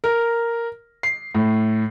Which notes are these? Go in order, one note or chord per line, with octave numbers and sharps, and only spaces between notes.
A#4
C7
A2